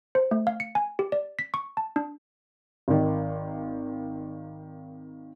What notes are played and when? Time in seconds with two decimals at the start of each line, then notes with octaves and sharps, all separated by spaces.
0.15 C5
0.31 A3
0.47 F5
0.60 C#7
0.75 G#5
0.99 G4
1.12 D5
1.39 B6
1.54 C#6
1.77 A5
1.96 D4
2.88 G#1 D#3